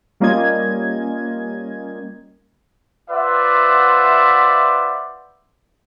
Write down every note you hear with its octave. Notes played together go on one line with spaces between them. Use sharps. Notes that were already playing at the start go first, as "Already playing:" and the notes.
G3 A#3 C#4 F4 D#5 G#6
F4 B4 C5 D5 E5 F#5